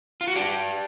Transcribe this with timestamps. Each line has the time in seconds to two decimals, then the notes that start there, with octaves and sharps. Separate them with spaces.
0.21 F4
0.28 F#4
0.35 D4 G4